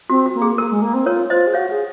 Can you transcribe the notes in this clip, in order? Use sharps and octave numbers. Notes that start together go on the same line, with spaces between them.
C4 F#4
F#4
A#3
G#4
A#3 A#4
G#3
A#3
C4
F4 A#4 C#5
F4 C5 D#5
G#4
F#4 C#5 F5
G#4